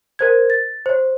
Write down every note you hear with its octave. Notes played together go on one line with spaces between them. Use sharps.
A#4 C5 G#6
A6
C5 C#5